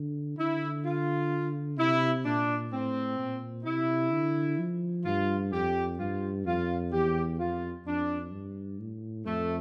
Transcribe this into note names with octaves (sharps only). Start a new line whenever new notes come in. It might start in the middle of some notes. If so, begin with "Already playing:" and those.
Already playing: D3
D3 E4
F4
C3 E4
A#2 D4
A2 C4
A#2
C3 E4
D3
F3
G2 F4
F2 G4
G2 F4
F2 F4
E2 G4
F2 F4
F2 D4
G2
A2
F2 A3